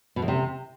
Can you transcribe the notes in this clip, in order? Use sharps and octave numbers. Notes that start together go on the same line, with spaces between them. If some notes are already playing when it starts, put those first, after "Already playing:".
B2
E2
C3